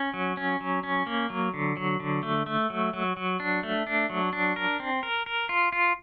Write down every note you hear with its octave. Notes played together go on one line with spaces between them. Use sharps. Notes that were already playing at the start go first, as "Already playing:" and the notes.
Already playing: C#4
F#3
C#4
F#3
C#4
A#3
F#3
D3
F#3
D3
A3
A3
F#3
F#3
F#3
D4
A3
D4
F#3
D4
A#4
C4
A#4
A#4
F4
F4